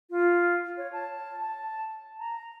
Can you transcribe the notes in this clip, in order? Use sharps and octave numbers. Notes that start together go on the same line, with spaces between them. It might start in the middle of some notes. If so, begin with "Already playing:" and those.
F4
C#5
A5
A5
A#5